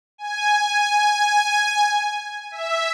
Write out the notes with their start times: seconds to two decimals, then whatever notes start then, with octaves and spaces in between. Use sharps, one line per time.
0.18 G#5
2.51 E5